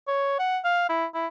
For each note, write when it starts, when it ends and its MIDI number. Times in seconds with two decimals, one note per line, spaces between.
0.08 0.35 73
0.39 0.58 78
0.64 0.86 77
0.89 1.05 64
1.14 1.27 64